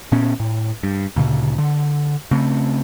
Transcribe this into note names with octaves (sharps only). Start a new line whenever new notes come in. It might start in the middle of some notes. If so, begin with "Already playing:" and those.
A#2 B3 C#4
A2
G2
D2 A#2 C#3
D3
C#3 A3 C4